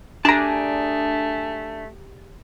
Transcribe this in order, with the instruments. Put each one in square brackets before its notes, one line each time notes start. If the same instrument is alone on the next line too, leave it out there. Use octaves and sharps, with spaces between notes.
[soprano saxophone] A3 [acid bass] D4 [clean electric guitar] G4 G#4 [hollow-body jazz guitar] A5 A#5